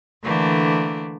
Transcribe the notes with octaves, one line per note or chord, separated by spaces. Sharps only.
D3 E3 A3 A#3 D4